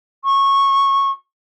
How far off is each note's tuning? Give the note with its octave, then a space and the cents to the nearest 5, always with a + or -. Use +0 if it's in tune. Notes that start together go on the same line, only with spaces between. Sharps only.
C#6 -15